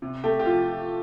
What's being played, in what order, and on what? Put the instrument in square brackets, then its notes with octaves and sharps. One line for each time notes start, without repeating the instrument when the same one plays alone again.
[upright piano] C3
[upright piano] A3 [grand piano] G4
[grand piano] G4
[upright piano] F3 [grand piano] F4